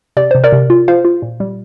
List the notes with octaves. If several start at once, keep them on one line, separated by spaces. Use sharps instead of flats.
C3 D5
C3 C5
A#4 D5
C3
F4
F4 C5 F5
F4
A#2
G3